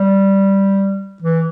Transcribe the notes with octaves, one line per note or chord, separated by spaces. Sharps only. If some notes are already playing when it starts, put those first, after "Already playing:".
Already playing: G3
E3